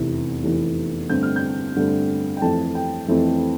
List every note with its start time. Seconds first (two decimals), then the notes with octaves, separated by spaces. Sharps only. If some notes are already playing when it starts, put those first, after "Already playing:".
Already playing: F1 E2 C3 E3
0.44 F1 E2 C3 E3
1.10 G2 D3 A3 C4 G6
1.23 F6
1.36 G6
1.76 G2 D3 A3 C4
2.37 G5
2.42 F2 E3 A3 C4 A5
2.75 G5
3.08 F2 E3 A3 C4